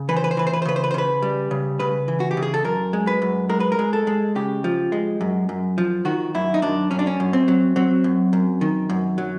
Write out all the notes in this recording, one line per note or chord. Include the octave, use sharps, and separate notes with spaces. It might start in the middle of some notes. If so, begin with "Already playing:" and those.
Already playing: C#3
E3 B4
C5
B4
C5
E3 B4
C5
B4
C5
C#3 B4
C5
B4
C5
C#3 B4
G3
C#3
C#3 B4
E3
F#4
G4
C#3
G#4
A4
F#2 A#4
G#3
B4
F#2
G#3 A#4
B4
A#4
G#3
A4
G#3
C#3 G4
F3
G#3
F#2
F#2
F3
D#3 F#4
F#2 E4
D#4
F#2 D4
F#2 C#4
D4
C#4
F#2
C4
F#3
F#3 C4
F#2
F#2
D#3
F#2
F#3